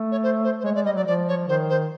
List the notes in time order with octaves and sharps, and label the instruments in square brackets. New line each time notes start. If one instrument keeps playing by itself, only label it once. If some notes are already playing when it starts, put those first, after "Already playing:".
Already playing: [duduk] A3
[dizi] C#5
C5
C5
C5
[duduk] G#3 [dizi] C#5
[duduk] G#3 [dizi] D5
[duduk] G3 [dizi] D#5
[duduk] F#3 [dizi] D5
[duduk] F3 [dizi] D5
[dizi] C#5
[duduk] D#3 [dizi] C5
[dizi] C5